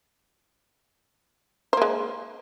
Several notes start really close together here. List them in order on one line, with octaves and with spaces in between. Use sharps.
C5 A#3 G#3